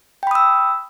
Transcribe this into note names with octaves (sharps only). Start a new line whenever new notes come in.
G5 B5 D#6 E6